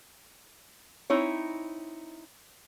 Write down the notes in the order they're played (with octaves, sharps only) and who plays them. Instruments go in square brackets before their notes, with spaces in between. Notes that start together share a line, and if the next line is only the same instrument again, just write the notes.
[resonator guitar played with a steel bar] C4 D#4 E4 C#5